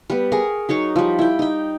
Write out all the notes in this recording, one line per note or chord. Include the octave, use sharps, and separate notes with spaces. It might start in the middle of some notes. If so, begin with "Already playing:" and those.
G3 B3
G#4 A#4 C#6
F#3 D#4 C#5 C#6
F3 G3
E4 G5
D#4 G5